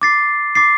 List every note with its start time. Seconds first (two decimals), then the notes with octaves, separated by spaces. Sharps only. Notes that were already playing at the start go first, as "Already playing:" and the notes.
0.02 D6 A6 C7
0.55 D6 A6 C7